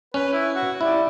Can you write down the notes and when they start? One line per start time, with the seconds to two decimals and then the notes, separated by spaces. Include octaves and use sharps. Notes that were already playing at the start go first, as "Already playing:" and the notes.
0.14 C#4 B4
0.33 E4
0.55 F#4
0.81 G3 E4